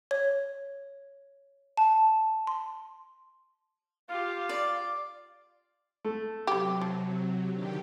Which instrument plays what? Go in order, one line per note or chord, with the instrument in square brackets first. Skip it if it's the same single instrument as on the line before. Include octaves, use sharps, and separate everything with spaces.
[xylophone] C#5
A5
C6
[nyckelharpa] F4 G4 [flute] F5
[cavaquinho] D5
[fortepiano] A3
[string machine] C3 F#3 [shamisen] B3 G4
[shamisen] F3
[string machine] D3 D#3 G4